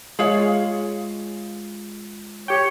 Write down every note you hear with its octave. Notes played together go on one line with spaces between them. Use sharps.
G#3 F4 G#4 C#5 F5
G4 C#5 G5